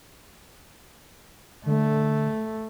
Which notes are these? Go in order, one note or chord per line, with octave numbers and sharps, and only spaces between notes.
D3 A3